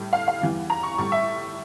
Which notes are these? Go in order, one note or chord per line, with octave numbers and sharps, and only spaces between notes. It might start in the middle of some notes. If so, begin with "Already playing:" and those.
Already playing: A2 G3
F5
F5
E2 E3 G3
A#5
C#6
A2 G3 C#6
E5